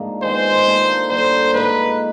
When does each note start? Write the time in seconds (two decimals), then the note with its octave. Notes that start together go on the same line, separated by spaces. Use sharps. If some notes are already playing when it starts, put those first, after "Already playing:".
Already playing: G#2 F3 A#3 D4
0.22 D#3 G#3 B3 C5
0.66 A#3 D4 F4 A4
1.09 D3 G3 A#3 C5
1.53 G#2 F3 A#3 D#4 B4